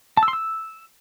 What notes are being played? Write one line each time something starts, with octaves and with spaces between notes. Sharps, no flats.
A5
E6
C6
E6